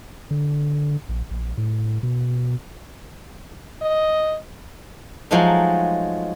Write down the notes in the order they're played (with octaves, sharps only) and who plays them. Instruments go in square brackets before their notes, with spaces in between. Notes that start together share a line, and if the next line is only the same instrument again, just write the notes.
[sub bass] D3
A#1
A#1
A2
B2
[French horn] D#5
[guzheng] F3 F#3 G#3 A3 D#4